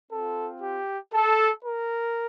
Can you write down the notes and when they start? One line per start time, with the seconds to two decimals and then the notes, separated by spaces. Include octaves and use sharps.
0.12 C4 F4 A4
0.62 G4
1.14 A4
1.65 A#4